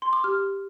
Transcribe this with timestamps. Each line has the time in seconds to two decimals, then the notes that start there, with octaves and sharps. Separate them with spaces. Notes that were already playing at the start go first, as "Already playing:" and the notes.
0.02 C6
0.13 D6
0.24 G4 F6